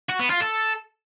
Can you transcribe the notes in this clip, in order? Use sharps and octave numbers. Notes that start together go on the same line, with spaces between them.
F#4
B3
F4
A4